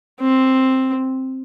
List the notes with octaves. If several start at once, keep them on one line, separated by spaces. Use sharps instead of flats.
C4